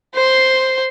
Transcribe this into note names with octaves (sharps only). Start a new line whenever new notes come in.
C5 C6